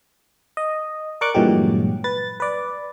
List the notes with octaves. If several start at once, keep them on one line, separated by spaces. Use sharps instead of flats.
D#5
A#4 D5 C#6 D6 F#6
G2 A#2 E3 F#3 G#3 G4
B4 A6
B4 D5